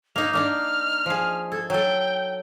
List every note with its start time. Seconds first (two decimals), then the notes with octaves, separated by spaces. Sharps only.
0.16 A#3 D#4 F7
0.33 A#3 D4 D#4 F6
1.06 F3 G#4
1.52 A4 G#6
1.70 F#3 A4 G5